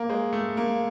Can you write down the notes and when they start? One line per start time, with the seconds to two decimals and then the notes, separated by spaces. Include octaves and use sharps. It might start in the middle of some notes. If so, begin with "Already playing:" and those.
Already playing: A#3
0.10 G#3
0.33 A3
0.57 A#3